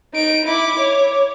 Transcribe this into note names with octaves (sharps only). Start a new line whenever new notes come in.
D#4 D7
E4 D6
C#5